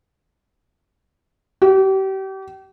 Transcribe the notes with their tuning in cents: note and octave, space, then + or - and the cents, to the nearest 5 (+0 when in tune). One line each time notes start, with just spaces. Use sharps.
G4 -35